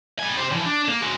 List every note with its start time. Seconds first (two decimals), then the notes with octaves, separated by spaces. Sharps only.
0.19 G3 G#5
0.37 G4 C5
0.52 E3 F3
0.66 D4
0.89 A#3
1.02 G#3 F#4